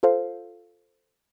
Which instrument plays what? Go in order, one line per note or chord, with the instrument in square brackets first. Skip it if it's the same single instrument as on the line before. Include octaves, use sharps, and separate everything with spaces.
[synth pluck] F4 A4 C5 F5